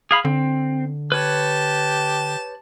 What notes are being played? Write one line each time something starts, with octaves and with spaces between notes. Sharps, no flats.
G#4 F5 B5
D3 C4
G4 B4 C#5 A5